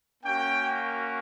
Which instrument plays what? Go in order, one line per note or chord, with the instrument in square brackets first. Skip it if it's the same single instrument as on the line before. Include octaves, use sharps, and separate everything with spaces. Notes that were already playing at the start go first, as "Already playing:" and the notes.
[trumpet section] A#3 C#4 F#4 G5